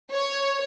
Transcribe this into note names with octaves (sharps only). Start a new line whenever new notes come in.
C#5